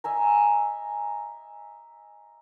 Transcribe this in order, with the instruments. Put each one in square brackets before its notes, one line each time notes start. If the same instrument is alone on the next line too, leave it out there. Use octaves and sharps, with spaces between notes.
[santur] D#5 E5 G#5 A#5